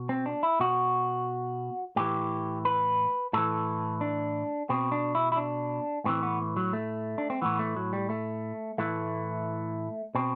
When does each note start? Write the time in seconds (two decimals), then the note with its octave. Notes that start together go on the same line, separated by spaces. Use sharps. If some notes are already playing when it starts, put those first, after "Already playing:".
Already playing: B2
0.09 C4
0.26 D4
0.43 E4
0.60 B2 F#4
1.96 A2 E3 G4
2.65 B4
3.33 A2 E3 A4
4.01 D4
4.70 B2 C4
4.92 D4
5.15 E4
5.32 E4
5.37 D4
6.05 A2 E3 C4
6.23 B3
6.57 F#3
6.73 A3
7.18 D4
7.30 C4
7.42 A2 E3 B3
7.59 A3
7.77 F#3
7.93 G3
8.10 A3
8.78 A2 E3 A3
10.15 B2 C4